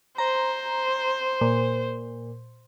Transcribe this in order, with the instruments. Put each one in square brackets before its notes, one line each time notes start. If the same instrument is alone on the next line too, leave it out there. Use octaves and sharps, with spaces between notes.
[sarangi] C5 [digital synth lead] A#5
[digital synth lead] A#2